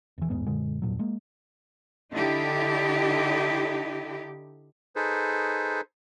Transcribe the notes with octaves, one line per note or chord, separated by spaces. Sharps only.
E1 E3
A1 E2 G#2 B3
F#2 A#2 D3 G#3
E2 G2 A#2 F#3
G#3 A#3
D3 D#4 E4 G4
D#4 G#4 A4 B4 C5